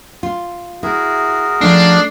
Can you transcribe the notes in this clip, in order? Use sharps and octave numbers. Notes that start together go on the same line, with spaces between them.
F4
E4 F#4 G#4 A#4
F3 A3 D4 D#4 C7